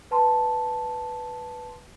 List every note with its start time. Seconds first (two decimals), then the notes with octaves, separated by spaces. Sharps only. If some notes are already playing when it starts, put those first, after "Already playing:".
0.11 B4 A5 C6